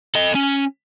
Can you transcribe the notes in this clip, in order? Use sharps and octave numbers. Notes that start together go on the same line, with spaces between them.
A4 D#5
C#4